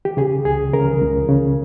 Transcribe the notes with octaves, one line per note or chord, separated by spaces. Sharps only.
G4
C#3 G#4
C#2 G#4
C#3 A#4
C#2
C#3